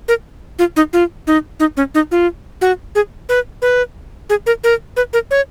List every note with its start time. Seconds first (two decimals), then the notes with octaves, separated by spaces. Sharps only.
0.08 A#4
0.59 F4
0.76 D#4
0.93 F4
1.27 D#4
1.60 D#4
1.77 C#4
1.95 D#4
2.11 F4
2.61 F#4
2.95 G#4
3.29 B4
3.62 B4
4.30 G#4
4.46 A#4
4.64 A#4
4.97 B4
5.13 A#4
5.31 C#5